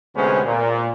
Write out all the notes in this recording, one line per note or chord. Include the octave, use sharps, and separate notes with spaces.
D2 C3 G#3 B3 C#4 C5
A#2